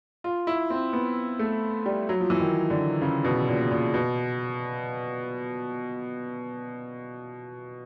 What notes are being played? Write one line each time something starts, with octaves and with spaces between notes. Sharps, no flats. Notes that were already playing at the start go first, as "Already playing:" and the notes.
F4
E4
C4
B3
A3
G3
F#3
F3
E3
D#3
D3
C#3
B2
A#2
A#2
B2